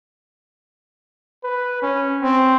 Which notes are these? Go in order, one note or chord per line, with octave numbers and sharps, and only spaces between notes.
B4
C#4
C4